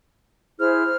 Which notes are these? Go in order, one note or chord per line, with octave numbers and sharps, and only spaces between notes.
E4 G#4 C5 F6